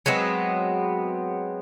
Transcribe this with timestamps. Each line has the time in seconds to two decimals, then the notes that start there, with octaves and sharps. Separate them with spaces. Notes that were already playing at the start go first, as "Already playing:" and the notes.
0.06 F#3 G#3 B3 C4